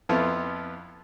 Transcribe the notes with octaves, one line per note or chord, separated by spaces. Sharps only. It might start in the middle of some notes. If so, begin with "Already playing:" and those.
F2 F3 B3 E4 F4